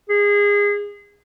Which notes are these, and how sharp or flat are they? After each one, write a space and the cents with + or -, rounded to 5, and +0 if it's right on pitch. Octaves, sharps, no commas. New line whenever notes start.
G#4 -25